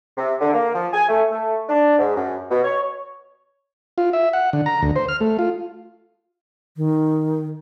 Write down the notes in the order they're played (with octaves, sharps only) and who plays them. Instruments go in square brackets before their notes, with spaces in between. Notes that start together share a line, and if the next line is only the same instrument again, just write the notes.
[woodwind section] C3
D3
A#3
F3
G#5
A3
A3
D4
G#2
F#2
B2
C#5
[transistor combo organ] F4
E5
F#5
D3
A#5
D2
C5
F6
A3
F4
[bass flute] D#3